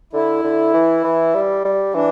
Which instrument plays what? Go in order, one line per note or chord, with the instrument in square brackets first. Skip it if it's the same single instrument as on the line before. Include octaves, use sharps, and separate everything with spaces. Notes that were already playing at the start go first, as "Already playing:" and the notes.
[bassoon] D3 [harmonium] E4
[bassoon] D3
E3
E3
G3
G3
[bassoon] E3 [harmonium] D4